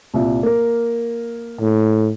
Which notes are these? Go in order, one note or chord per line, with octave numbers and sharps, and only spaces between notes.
C2 A#2 E5
A#3 A#4
A2